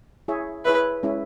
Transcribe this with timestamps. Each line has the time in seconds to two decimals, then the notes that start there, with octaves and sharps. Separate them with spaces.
0.28 E4 G#4 C#5 E5
0.65 E4 G#4 B4 C#5 E5
1.03 G#3 C#4 E4